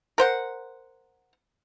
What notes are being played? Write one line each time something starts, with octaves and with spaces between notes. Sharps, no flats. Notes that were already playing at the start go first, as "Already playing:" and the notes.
A#4 C5 F#5